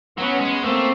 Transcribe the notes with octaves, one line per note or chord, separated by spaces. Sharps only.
F#3 B3 C#4
G#3
A3 A#3 C4